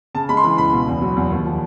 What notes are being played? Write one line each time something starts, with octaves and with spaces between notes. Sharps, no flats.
C#3 A5
G#3 B5
C6
E3 B5
C#2 B5
B2
E2
F#3
E2
D#2
F3